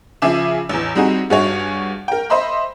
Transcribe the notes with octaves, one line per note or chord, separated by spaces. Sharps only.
C#3 F3 G#4 E5 D6 E7
A1 E2
G3 C4 D#4 F#4 G#4
G2 F#4 G#4 C#5
A#4 G5
C5 D#5 E5 B5 C6